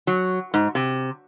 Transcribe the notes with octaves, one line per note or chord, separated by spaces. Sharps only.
F#3
G#2
C3